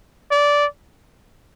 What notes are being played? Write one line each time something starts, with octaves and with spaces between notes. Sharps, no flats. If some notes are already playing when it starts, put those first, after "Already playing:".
D5